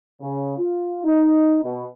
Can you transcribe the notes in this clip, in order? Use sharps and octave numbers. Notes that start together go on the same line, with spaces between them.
C#3
F4
D#4
B2